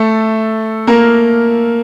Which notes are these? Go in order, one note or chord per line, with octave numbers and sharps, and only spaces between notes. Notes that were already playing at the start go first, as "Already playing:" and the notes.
Already playing: A3 A4
A#3 A#4